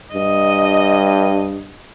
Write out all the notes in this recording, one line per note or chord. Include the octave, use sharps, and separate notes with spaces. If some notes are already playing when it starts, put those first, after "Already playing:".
G2 D#5